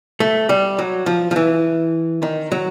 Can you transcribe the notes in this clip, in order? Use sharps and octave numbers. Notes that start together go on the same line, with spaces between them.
A3
G3
F#3
F3
F3
E3
D#3
F#3